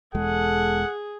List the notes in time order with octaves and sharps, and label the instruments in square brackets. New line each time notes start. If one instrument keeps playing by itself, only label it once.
[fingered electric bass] E1 E2 G#3 [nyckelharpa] G#4 [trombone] A4 [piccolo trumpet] F#5